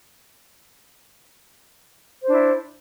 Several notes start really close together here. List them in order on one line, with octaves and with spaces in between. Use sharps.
C5 D4 E4 D5